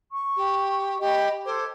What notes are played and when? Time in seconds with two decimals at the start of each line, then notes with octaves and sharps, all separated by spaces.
0.11 C#6
0.37 G4
1.00 G4 D#5 B5
1.46 A4 C5 D6 G#6